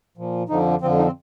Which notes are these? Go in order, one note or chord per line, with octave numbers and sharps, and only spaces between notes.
A#2 F3
F2 D3 F3 D#4
F2 D3 F3 C4
D#4
C4